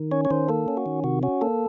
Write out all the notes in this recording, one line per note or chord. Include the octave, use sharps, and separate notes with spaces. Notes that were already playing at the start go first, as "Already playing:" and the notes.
Already playing: D#3
C#4 C#5
C#5
D#3 C5
A#3 A4
C#4
F#4
D#3
C3 F#4
C#4 F#4
A#3 A4